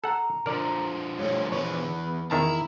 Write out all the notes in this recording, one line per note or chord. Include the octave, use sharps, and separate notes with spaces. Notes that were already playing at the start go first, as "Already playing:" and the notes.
A4 F#5 A#5
D3 F3 A#4 D5
G2 A3 C#5
E2 B4 C#5 B5
E2 D#3 E4 A#4 A5 A#5